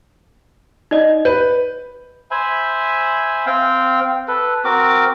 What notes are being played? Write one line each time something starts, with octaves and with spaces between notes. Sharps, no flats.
D#4 D5 D#5
B4 G6
C5 E5 G#5 B5
C4 F5 G5
A4 B4
C4 F#4 A#4 D6